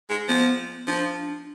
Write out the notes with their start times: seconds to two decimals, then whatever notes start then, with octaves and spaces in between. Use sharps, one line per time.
0.10 G#3
0.28 F3 B3
0.87 F3 D4